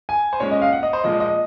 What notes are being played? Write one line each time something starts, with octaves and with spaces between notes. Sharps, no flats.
G#5
C5
A#2 G#3 C#4 C#5
D#5
F5
F#5
D#5
C5
A#2 F3 G#3 D#5
D#5